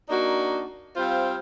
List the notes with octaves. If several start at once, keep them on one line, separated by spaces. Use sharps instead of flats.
A#3 D4 D#4 F#4
G3 C4 F4 C5 F5